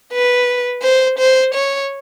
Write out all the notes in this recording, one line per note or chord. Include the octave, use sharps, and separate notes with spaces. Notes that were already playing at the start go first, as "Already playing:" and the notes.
B4
C5
C5
C#5